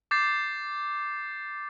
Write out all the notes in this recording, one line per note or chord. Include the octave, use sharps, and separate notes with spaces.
D6 G6 A6 C7